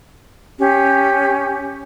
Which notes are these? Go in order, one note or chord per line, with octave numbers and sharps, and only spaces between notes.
C#4 G4